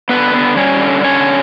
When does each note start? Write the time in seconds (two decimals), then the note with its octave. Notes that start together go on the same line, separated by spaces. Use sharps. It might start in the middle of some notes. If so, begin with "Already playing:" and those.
0.09 D3 B3 B4
0.34 B3
0.57 G3 C#4 C#5
0.80 D3
1.04 D3 C#4 C#5